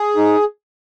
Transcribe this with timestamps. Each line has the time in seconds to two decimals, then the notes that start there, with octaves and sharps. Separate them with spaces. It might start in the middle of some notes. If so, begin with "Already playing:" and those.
Already playing: G#4
0.17 D#4